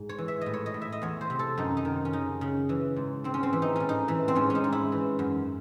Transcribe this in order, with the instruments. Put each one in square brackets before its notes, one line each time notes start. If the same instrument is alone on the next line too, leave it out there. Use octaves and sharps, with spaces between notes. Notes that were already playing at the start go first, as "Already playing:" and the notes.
Already playing: [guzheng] G#2
C#5
E3
E5
A2 D#5
C#5
D#5
A2
E5
D#5
E2 C#5
C5
C3
A4
F#2 D#4
D#4
D#3
C#4
C#3 D#4
C#3
E3
G#2
G#2 C4
C#4
C4
E3
D#4
A2 C#4
D#4
E3
C4
G#2 C#4
C#4
D#4
G#2
E4
E3
F#2